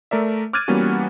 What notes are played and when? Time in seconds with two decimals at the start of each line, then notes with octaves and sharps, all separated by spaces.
0.11 A3 A#4 D5 E5
0.53 D6 F6 F#6 G#6 A6 D#7
0.68 E3 G3 A#3 B3 C#4 F#4